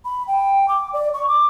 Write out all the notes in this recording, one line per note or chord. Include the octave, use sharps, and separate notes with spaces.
B5
G5
D6
D5
C#6
D6